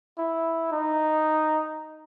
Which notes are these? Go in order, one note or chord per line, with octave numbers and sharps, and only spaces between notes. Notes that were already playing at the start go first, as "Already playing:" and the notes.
E4
D#4